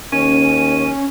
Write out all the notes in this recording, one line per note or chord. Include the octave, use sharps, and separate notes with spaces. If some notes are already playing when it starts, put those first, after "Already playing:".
D#2 C#4 D#7